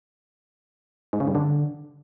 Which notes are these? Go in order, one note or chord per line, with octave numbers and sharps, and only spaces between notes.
G#2
C#3
G2
D3